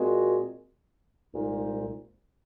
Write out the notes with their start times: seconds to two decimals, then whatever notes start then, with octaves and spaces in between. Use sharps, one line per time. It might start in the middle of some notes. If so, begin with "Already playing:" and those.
Already playing: A#2 G#3 C4 F#4
1.33 C2 A#2 G#3 D#4